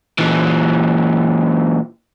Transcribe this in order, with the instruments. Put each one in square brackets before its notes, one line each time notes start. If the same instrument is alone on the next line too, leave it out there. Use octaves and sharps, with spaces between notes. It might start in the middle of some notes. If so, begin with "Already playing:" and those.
[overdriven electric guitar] A#2 E3